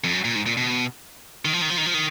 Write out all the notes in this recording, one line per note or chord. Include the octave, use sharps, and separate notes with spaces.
F2
F#2
A#2
G#2
A#2
B2
D#3
F3
D#3
F3
D#3
F3
D#3